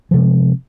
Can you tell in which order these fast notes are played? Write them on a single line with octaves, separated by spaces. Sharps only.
F3 C3 G#3